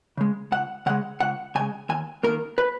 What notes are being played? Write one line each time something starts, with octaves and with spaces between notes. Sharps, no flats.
C#3 G#3
C#2 F#5
C#3 G#3 F#5
C#2 F#5
C#3 G#3 G#5
D#2 G#5
D#3 A#3 A#4
B4